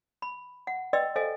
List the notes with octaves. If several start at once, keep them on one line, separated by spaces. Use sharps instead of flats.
B5
F#5
B4 D5 D#5 G5 C6 E6
A4 C5 D#5 F5 G#5